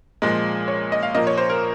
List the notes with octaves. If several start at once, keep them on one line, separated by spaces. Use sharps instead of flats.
A#2 F3 G#3
C#5
D#5
F5
A#2 F3 A#3 D#5
C#5
C5
A#4